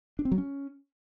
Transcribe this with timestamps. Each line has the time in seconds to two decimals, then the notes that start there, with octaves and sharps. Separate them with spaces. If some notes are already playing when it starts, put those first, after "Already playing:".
0.19 D4
0.25 C4
0.32 F#3
0.38 C#4